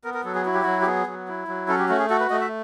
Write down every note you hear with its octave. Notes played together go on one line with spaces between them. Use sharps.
B3 A#4
A#4
F#3 A4
G#4
E4 F#4
G4
F#3 F#4
G4
B3 G#4
F#3
E4
F#3
C#4 A4
G4
A3 F#4
G#4
F#4 A4
B4
A3 D#5
E5